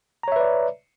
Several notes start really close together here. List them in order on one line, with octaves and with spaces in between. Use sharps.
A#5 C#5 E5 B4 D5